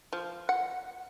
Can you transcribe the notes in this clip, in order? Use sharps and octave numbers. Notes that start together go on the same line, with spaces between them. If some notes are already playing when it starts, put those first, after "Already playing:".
F3
F#5